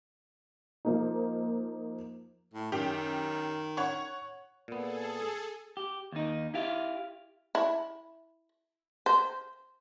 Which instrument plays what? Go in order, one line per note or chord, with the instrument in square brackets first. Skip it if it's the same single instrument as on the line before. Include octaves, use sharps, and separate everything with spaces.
[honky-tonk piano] F3 A#3 D#4
[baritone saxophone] A2
[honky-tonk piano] F#2 G4 [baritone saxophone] D#3
[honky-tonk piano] C#5 F#5 C#6
[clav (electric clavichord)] A#2 B3 [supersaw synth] G#4 A4
[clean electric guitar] G4
D#2 D#4
E4 G4 F5
[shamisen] E4
C5